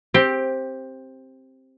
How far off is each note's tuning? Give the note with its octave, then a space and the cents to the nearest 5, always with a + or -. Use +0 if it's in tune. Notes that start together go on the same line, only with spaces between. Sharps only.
C4 +10 G4 +0